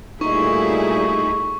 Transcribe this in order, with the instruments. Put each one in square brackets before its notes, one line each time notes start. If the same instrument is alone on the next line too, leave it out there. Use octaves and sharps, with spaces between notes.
[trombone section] A#2 G3 A3 [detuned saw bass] D#4 [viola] E4 G#4 [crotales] C#6